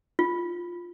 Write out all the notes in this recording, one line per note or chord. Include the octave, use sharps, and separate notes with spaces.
F4